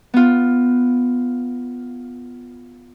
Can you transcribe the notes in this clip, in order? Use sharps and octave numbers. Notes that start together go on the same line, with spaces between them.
B3 F4